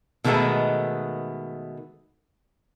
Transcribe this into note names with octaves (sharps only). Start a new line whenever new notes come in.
B2 D#3 G#3 A3 B3